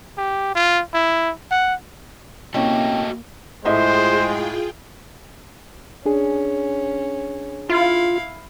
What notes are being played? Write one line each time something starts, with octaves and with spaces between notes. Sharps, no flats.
G4
F4
E4
F#5
C3 A3 A#3 C#4 E4 F#4 D#5 G5
A2 G#3 F4 G#4 C5 D#5 E5 G5
C#4 D4 G#4
E4 F4 F5